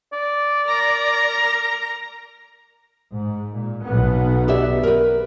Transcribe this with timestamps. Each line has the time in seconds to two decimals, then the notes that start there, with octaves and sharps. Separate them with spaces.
0.13 D5
0.67 A#4 A#5
3.13 G#2
3.53 A#2
3.84 B1 B3
4.48 G4 D5 E5
4.83 A#4 B4